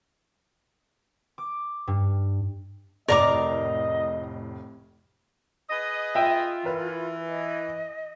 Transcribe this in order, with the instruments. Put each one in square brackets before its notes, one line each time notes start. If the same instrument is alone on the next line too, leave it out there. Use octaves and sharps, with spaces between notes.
[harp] D6
G2
[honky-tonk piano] F1 A2 [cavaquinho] A#4 A#5 D6 [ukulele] D5 [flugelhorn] D#5
[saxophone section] G#4 B4 D#5
[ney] F4 [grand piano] E5 G5
[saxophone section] E3 [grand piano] A#4 B4
[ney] D#5